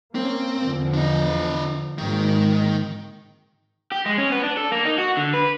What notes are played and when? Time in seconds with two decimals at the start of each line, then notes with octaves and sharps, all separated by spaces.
0.15 A#3 C4 C#4
0.63 E2 D3 F3
0.94 D4 D#5
1.98 G#1 D#3 G#3 A#3
3.92 G4
4.05 G#3
4.18 C#4
4.32 B3
4.43 D4
4.57 A4
4.71 A#3
4.85 D#4
4.98 F#4
5.17 D3
5.34 B4